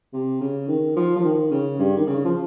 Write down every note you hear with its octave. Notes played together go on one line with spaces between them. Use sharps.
C3
C#3
D#3
F3
F3
D#3
C#3
G2
D#3
C#3
F3